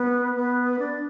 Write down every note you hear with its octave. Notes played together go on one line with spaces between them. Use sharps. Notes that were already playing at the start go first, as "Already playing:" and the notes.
Already playing: B3
B3
D4